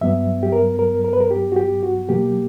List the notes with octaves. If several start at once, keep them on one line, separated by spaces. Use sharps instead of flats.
G2 F#3 B3 E5
G4
A#4
A#4
A#4
B4
A#4
G4
F#4
G4
F#4
B2 F#3 A#3 G4